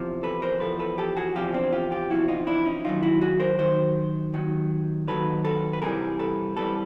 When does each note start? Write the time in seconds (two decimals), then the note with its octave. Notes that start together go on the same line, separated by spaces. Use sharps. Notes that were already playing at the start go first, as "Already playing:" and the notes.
Already playing: E2 C3 F3
0.23 A4 B4
0.42 A#4 C5
0.60 E2 C3 F3 A4 B4
0.79 A4 B4
0.98 G4 A4
1.17 F#4 G#4
1.35 E2 C3 F3 F4 G4
1.54 C4 D4
1.72 F4 G4
1.91 F4 G4
2.09 E2 C3 F3 E4 F#4
2.28 D#4 F4
2.47 D4 E4
2.65 C#4 D#4
2.84 D#2 D#3 F#3 D#4 F4
3.03 E4 F#4
3.21 F#4 G#4
3.40 A#4 C5
3.59 D#2 D#3 F#3 C5
4.34 D#2 D#3 F#3
5.08 D#2 D#3 F#3 A4 B4
5.45 A4 B4
5.73 B4
5.82 C2 C3 E3 G3 G#4 A#4
6.19 A4 B4
6.57 C2 C3 E3 G3 A4 B4